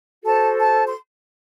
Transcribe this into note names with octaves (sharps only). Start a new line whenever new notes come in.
F#4 A4 C5 A5
A5
C6